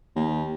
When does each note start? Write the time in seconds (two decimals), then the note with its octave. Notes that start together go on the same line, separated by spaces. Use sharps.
0.15 D#2